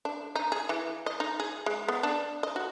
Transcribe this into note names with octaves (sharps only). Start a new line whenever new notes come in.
D4
D#4
G#4
E3
D#5
D#4
G#4
G#3
B3
D4
D#5
F#4